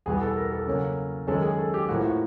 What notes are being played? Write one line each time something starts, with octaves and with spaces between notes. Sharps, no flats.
E2 B2 G3 B3 G#4
A4
A#4
A4
C#3 F#3 A#3 C#4
F#2 D#3 G#3 C#4 A4
G#4
A4
G4
A2 F3 A#3 F#4
F#4